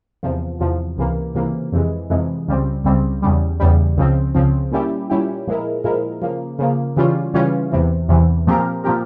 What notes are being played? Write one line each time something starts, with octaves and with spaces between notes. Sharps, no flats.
E2 C3 F3
E2 C3 F3
C#2 C3 E3 A#3
C#2 C3 E3 A#3
F2 C3 E3 G#3
F2 C3 E3 G#3
C#2 C#3 G3 C4
C#2 C#3 G3 C4
E2 C#3 G3
E2 C#3 G3
C#2 C#3 F3 C4
C#2 C#3 F3 C4
A#2 G3 C#4 E4 G4
A#2 G3 C#4 E4 G4
A#2 F3 G#3 E4 A#4
A#2 F3 G#3 E4 A#4
C#3 F3 A#3
C#3 F3 A#3
C#3 E3 G3 C#4 F4
C#3 E3 G3 C#4 F4
E2 C3 E3
E2 C3 E3
A#2 F3 C4 G4 A#4
A#2 F3 C4 G4 A#4